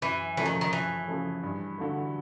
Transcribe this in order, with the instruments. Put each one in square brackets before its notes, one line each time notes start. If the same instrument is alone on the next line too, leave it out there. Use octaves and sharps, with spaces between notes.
[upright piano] F#2 [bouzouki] E3
[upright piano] C#3 F3 A3 [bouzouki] E3
[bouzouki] D#3
D#3
[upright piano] F#2 [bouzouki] E3
[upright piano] C#3 F3 A3
G2
D3 F#3 A3